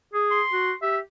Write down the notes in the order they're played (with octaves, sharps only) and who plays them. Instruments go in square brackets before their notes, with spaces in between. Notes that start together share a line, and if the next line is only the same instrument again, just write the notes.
[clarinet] G#4
[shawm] C6
[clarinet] F#4
[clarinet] G4 [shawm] E5